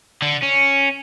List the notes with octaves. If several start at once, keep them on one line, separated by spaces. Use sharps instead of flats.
D3
C#4